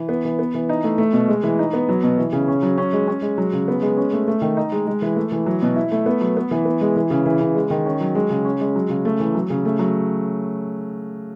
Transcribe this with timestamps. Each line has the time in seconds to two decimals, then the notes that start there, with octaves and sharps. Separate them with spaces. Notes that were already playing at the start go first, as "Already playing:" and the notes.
Already playing: E3
0.09 B3
0.25 E3
0.39 B3
0.54 E3
0.69 D#4
0.84 A3
0.98 A3
1.13 B2
1.28 G#3
1.43 E3
1.59 D#4
1.73 B3
1.89 F#3
2.03 B2
2.18 E3
2.33 C#3
2.48 C#4
2.63 F#3
2.78 C#4
2.93 G#3
3.08 C#4
3.22 G#3
3.38 F#3
3.53 C#3
3.68 B3
3.82 G#3
3.97 C#4
4.13 A3
4.28 A3
4.41 D#3
4.57 D#4
4.72 G#3
4.87 G#3
5.02 E3
5.16 A3
5.32 E3
5.46 F#3
5.62 B2
5.76 E4
5.92 A3
6.06 B3
6.21 F#3
6.37 B3
6.51 E3
6.65 B3
6.81 G#3
6.96 E3
7.10 C#3
7.26 E3
7.40 C#3
7.55 G#3
7.70 D#3
7.86 C#4
8.01 F#3
8.15 G#3
8.30 C#3
8.45 C#4
8.61 G#3
8.76 F#3
8.89 C#3
9.05 A3
9.20 E3
9.35 F#3
9.50 C#3
9.65 A3
9.79 F#3